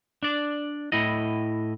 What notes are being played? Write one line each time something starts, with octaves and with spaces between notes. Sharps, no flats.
D4 D5
A2 E4 D#5